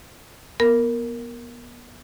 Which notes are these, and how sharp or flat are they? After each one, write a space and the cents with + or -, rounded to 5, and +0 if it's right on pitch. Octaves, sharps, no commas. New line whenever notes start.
B3 -30 A#4 -5